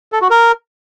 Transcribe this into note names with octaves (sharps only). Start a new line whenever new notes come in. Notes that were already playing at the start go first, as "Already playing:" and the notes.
A4
F#4
A#4